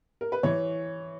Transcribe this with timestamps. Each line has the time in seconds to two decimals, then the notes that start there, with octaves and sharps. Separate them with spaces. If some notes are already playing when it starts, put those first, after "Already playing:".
0.21 A#4
0.32 B4
0.43 E3 C#5